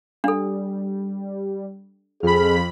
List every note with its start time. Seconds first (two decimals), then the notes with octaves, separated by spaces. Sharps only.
0.24 G3 D4 A4
2.23 F2 G#4 B5 F6